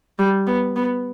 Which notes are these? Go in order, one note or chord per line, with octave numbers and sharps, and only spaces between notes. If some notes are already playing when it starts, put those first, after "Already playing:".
G3
B3
B3